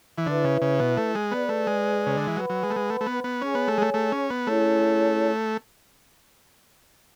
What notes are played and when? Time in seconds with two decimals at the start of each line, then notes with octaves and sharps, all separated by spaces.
0.18 E3
0.26 D3 E4 B4 E5
0.44 C#3
0.62 C#3
0.79 B2
0.97 A3
1.15 G#3
1.31 B3 G#4 B4 D5
1.49 A3
1.67 G#3
2.06 C#3
2.17 D3
2.27 E3
2.36 F#3 B4 F#5 B5
2.50 F#3
2.63 G#3
2.70 A3
2.76 G#3
2.90 A3
3.01 A3
3.06 B3
3.24 B3
3.41 C#4 G#4 C#5 G#5
3.55 B3
3.68 A3
3.78 G#3
3.82 A3
3.94 A3
4.12 C#4
4.30 B3
4.46 A3 C#4 E4 G#4 C#5